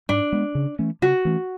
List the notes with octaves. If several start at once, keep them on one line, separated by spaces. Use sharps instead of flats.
G#2 D4
G#3 B3
C#3
E3 A3 C#4
C#3 F#4
E3 A3 C#4